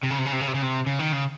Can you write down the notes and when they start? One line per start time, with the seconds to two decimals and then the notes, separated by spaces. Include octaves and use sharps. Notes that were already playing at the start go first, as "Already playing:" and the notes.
0.03 C3
0.10 C#3
0.18 C3
0.25 C#3
0.32 C3
0.40 C#3
0.47 C3
0.54 C#3
0.62 C3
0.86 C#3
0.99 D#3
1.12 C#3